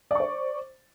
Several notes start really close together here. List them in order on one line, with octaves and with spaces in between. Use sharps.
D5 C#6 C5